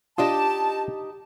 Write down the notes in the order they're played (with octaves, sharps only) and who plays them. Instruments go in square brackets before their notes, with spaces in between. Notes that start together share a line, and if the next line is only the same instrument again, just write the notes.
[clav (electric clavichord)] D4 F4 [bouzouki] D#4 G4 D#5 [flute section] A5